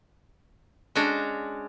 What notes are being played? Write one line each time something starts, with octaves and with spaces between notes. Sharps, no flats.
G#3 C#4 D4 F#4